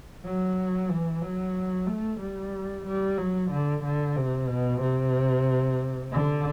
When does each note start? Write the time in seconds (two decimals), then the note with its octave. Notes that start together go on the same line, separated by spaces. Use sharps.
0.24 F#3
0.89 E3
1.22 F#3
1.87 A3
2.20 G3
2.86 G3
3.18 F#3
3.51 D3
3.83 D3
4.16 C3
4.48 B2
4.81 C3
6.12 D3